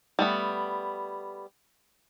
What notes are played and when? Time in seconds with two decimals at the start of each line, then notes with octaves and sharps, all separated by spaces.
0.19 G3 A3 B3